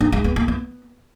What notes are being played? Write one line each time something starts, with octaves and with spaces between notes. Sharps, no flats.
D#4
G#3
B3
A#3
B3